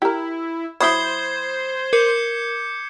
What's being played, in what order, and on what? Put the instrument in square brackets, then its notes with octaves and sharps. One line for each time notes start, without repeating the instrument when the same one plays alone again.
[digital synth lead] E4 [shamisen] G4 A#4
[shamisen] F#3 E4 [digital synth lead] C5 [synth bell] B5 D#6 [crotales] G#6 C7 G7
[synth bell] A#4 [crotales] D6 G6 C#7